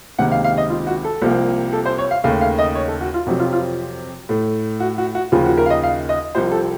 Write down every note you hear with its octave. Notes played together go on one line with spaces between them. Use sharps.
C#2 C3 D#3 A#3 F#5
F5
F5
D#5
F4
F#4
A4
C2 C3 F3 A#3
A4
C5
C#5
F5
D#2 C#3 A3 F5
F5
D#5
C#5
A4
F#4
F4
F2 C3 F#3 F#4
F4
F4
A2 A3
F#4
F#4
F#4
D#2 C#3 F3 F4
F#4
A#4
F5
D#5
F5
D#5
C2 C3 F3 C5
A4